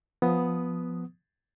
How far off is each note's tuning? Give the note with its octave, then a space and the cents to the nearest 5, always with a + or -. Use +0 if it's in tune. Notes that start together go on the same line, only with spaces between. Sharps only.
F3 +0 B3 +0 D#6 +0